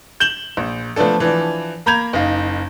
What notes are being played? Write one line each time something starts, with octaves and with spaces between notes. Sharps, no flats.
G6 E7 F#7 G7
A#1
F3 A3 B3 D4 A4
E3 F3 D4
A#3 A#5 B5 G6 G#6 F7
F#1 D#4 F5